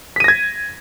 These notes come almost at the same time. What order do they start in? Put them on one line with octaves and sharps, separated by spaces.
B6 D#7 A#6 G#6